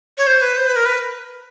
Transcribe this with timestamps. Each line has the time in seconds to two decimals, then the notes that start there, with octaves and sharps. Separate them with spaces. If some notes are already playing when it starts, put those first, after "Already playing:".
0.18 C#5
0.27 C5
0.42 B4
0.57 C5
0.67 B4
0.76 A#4
0.86 B4